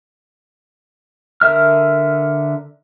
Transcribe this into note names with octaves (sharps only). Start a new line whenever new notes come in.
D3 A#4 E5 F6